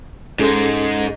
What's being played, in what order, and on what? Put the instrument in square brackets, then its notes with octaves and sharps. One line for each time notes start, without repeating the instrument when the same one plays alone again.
[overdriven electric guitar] G#2 G#3 [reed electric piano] C#4 G#4 A4